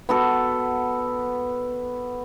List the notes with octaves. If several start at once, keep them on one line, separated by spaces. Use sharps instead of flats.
B3 F#4 A4